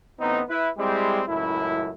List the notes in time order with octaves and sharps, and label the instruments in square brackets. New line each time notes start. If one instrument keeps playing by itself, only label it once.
[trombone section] A1 B3 C4 D#4
E4 B4
G3 G#3 C4 E4 G4
C#2 F#2 A2 E4